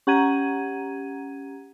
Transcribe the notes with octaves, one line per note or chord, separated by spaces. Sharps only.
C#4 G4 F#5 A#5 G#6 D#7